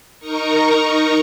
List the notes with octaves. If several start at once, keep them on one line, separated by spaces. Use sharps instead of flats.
D#4 A#4 A#5 C#6